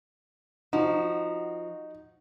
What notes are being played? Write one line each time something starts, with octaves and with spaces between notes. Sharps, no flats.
F3 D#4 F#4